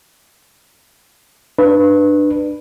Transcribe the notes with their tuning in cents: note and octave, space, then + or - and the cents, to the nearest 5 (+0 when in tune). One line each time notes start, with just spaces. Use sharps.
D4 +20 B4 +0